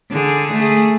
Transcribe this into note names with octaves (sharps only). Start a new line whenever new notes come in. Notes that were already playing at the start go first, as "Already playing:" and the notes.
D3 G#4
A3 G#4